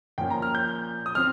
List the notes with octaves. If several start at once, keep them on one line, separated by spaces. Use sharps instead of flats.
A#2 F3 A#3 C#4 G5
A#5
F6
G6
D#6
F3 C4 F6